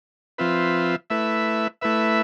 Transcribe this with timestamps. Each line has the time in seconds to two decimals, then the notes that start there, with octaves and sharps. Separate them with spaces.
0.38 F3 C4 F4 B4 E5
1.10 A3 E4 B4 E5
1.81 A3 E4 B4 E5